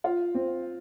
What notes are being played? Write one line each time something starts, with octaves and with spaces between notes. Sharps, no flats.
F4
C4